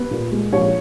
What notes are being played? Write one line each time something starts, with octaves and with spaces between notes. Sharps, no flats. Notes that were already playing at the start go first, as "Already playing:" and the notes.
Already playing: B3
A#2
G#3
A#1 C#5